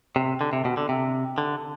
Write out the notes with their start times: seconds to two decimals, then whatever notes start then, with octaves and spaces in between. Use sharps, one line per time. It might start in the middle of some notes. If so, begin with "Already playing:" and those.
0.16 C3
0.41 D3
0.53 C3
0.65 B2
0.77 D3
0.89 C3
1.38 D3